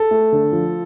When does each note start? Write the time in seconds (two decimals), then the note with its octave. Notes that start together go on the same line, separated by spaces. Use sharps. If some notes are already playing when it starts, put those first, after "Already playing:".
Already playing: A4
0.11 A3
0.32 D3
0.52 F3